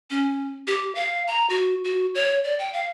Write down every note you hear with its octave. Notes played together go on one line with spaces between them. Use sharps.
C#4
G4
F5
A#5
F#4
F#4
C#5
D5
G5
F5